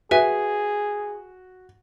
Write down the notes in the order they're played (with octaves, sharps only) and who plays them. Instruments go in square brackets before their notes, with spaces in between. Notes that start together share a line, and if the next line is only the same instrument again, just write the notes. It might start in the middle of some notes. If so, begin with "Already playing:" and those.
[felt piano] F#4 [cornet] G#4 [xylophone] B4 E5 G#5